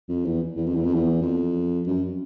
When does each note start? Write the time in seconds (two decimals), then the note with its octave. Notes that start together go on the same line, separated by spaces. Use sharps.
0.09 F2
0.25 E2
0.56 E2
0.66 F2
0.75 E2
0.84 F2
0.94 E2
1.22 F2
1.87 F#2